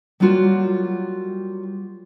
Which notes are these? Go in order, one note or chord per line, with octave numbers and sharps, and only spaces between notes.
F#3 G3 A#3 F4 F#4 A#4